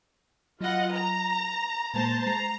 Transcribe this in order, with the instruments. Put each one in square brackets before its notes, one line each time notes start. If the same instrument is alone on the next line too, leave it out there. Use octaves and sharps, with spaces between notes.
[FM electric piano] F#3 B5 [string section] F4 D#5 F#5
[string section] A#5
[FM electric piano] A#2 G#3 A#3 [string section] C5 A5 A#5
[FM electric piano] G#3 C7 [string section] A#5